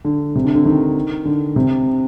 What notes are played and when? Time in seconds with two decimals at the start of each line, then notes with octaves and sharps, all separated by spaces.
0.05 D3
0.35 C3
0.44 D3
0.55 D3
0.66 D#3
1.25 D3
1.56 C3